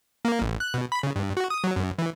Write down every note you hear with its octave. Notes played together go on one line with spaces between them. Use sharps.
A#3
A1
F#6
B2
B5
C#3
G2
F#4
D#6
F#3
F#2
E3